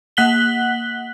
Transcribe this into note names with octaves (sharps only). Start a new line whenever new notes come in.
A#3 F#5 F#6 B6 F#7 G7